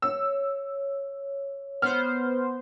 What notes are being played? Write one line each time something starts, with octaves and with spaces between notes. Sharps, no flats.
C#5 E6
B3 C5 F6